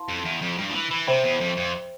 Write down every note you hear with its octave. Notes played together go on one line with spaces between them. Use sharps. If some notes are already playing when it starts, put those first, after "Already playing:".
Already playing: E4 B4 F5 A5 C6
F2
E2
F2
G2
F3
E3
E3
C3 C5 E5 G5 B5
E2
F2
F2